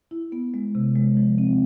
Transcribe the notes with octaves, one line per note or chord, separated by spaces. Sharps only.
E4
B3
G#3
C3
G#3
F3
C4